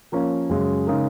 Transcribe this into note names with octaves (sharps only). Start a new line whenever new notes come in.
F3 A#3 C#4
F#2 C#3 G#3
C#3 G#3 D#4 A#4